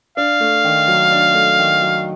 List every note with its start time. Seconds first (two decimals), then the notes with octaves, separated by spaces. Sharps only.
0.17 D4 F5
0.40 A3
0.64 D#3
0.88 F#3
1.11 D4
1.34 A3
1.59 D#3
1.82 F#3